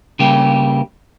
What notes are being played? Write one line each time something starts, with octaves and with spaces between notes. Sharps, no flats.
C#3 G3 A#3 G4